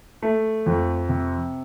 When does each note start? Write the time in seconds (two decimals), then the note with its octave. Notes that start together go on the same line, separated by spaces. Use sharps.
0.22 A3
0.66 F2
1.09 C3